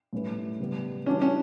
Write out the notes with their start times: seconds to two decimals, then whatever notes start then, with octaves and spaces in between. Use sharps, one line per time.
0.13 A2 G3 C#4 E4 B4
0.59 C#3 G3 B3
1.06 E3 G3 C#4 D4 F#4 B4
1.22 C#4